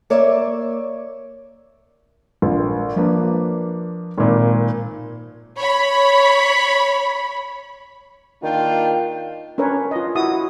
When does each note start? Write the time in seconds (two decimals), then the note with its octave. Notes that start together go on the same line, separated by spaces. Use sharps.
0.10 A#3 C#5 D5 E5
2.42 A#1
2.96 F3 A#3 D4 B4
4.18 G#1 A#2
5.59 C#5 B5
8.43 D#3 A#3 D4 F4 G5
9.58 C#4 D4 A#4 B4 C#5
9.91 F4 D#5
10.15 E4 F#4 D#6